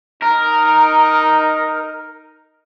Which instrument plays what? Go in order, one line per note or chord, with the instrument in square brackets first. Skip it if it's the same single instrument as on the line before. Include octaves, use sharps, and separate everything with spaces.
[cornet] D#4 [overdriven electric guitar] A#4